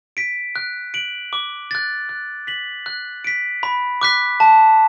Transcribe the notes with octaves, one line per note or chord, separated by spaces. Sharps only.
B6 D7
F#6
D7 F#7
D6
F#6 A6
F#6
B6 F#7
F#6
B6 D7
B5
D6 F#6 B6
A5